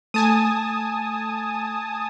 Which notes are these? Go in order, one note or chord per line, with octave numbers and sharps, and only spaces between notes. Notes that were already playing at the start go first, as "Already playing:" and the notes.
A3 G#5 A5 D#6